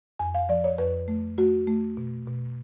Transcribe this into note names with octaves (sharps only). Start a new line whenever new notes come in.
F2 G#5
F5
F3 D5
C#5
F2 B4
A3
A3 F#4
A3
B2
B2